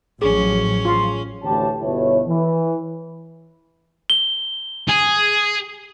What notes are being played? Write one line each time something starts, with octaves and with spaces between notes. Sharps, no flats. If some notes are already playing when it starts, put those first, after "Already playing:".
A1 F3 F#3 C#4 G#4
F4
A1 D2 E3 G4 C#5 A5
G1 B2 E4 C#5
E3
G7
G#4